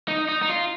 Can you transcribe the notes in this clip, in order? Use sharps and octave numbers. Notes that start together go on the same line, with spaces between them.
D#4
D#4
D#4
F4